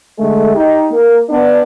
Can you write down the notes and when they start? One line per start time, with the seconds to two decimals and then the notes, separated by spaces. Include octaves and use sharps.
0.19 D3 G#3 A3
0.54 D#4 G4
0.91 A#3
1.30 B3 D4